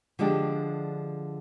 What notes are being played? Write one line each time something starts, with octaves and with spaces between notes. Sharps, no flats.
D3 F3 G#3 D4 G4